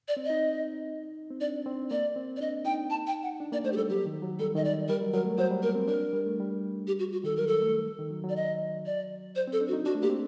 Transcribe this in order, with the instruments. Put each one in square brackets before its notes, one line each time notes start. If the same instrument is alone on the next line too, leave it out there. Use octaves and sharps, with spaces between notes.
[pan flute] D5
[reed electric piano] C4
[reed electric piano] D#4 [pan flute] D#5
[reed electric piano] C4
[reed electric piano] D4 [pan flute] D5
[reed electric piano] C4
[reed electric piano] A#3 [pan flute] D5
[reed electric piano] C4
[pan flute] D5
[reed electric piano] D4 [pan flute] D#5
[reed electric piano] D#4 [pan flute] G5
[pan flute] A5
G5
F#5
[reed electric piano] D4
[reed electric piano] A#3 [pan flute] D5
[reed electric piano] A3 [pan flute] C5
[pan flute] G4
[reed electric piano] G3 [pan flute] A4
[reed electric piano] F#3 [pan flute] G4
[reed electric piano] D#3
F#3
[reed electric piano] G3 [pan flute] A4
[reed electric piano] D#3 [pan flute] D#5
[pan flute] D5
[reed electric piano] G3 [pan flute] A#4
[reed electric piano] F#3
[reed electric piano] F#3 [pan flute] A#4
[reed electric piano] A3
[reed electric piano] F#3 [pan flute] C5
[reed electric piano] G3
[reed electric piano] A#3 [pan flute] A#4
[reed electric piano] C4
[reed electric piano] D4 [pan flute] A#4
[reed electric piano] G3
A3
G3
[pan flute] G4
F#4
F#4
[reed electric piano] D#3 [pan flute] A4
[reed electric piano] F#3 [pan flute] A#4
[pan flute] A4
[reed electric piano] A3
D#3
F#3
F#3
[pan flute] D5
D#5
D5
C5
[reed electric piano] C4
[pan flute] A4
[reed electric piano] D4
[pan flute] F#4
[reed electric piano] D#4
[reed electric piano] D4 [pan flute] F#4
[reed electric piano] A3
[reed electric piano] A#3 [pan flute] G4
[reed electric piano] C4